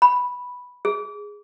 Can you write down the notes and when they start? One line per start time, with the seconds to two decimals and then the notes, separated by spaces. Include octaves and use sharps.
0.02 B5
0.85 G#4